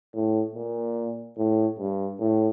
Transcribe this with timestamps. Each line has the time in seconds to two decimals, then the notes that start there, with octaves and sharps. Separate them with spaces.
0.14 A2
0.55 A#2
1.37 A2
1.79 G2
2.20 A2